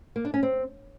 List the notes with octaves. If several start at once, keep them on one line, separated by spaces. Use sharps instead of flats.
A#3
D4
C#4
C4